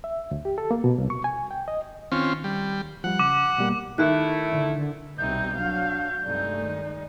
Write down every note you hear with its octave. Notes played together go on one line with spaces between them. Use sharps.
E5
D2
G4
A4
A#3
B2
C2
C#6
G#5
G5
D#5
D#3 C4 C#4 F4
G3
F3 G3 F#5
C#3 D6
B2 G3 A#3
D#3 A3 E4 E5 F#6
D3
C2 B2 G3 C4 D#4 E5 G6
F#3 D4 F#4 F5
G2 C3 G#3 A3 D#4 D5
D#3